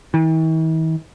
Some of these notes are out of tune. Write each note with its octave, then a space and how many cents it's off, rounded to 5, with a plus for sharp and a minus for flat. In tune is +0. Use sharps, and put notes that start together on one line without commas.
E3 -45